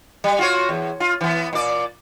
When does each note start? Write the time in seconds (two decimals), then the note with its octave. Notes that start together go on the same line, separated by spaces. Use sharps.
0.24 G3
0.39 F4 F#4 C#5
0.69 E2
1.00 F4
1.21 E3 B3
1.53 A#2 D5